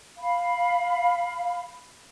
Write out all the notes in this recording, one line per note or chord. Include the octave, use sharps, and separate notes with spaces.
F5 B5